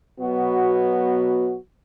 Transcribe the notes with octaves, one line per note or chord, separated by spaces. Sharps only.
B2 F#3 B3 F#4